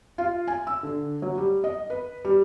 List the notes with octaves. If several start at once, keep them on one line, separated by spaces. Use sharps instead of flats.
F4
G#5
E6
D3
F#3
G3
D#5
B4
G3